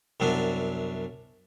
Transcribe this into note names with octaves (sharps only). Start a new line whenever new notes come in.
C2 F#2 F#3 B3 D4